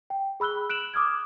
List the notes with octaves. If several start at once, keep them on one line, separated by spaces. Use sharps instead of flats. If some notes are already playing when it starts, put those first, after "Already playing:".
G5
G#4 B5 E6 F#6 G7
F#6 D7 E7 F#7
D6 D#6 F6 G#6